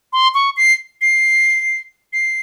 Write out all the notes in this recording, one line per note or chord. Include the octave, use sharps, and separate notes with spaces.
C6
C#6
C7
C7
C7